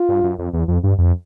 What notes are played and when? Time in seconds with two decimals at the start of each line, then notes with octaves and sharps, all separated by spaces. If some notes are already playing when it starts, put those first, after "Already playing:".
Already playing: F4
0.09 G2
0.24 F#2
0.39 F2
0.53 E2
0.68 F2
0.83 G2
0.98 F2